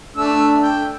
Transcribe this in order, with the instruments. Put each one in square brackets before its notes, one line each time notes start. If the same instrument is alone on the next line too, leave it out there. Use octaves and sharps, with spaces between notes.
[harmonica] A3 E6 [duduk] D4
[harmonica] G5